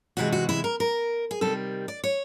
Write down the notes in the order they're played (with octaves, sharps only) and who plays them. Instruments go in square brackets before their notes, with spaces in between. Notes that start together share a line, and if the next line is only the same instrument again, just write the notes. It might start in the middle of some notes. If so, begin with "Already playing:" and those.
[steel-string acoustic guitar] E2 C3 E3 G#3 F#4
F#4
E4
A#4
A#4
G#4
C3 D#3 G3 C4 A4
D5
C#5